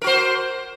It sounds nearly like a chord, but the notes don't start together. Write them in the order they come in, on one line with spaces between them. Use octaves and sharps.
A#4 F#4 C5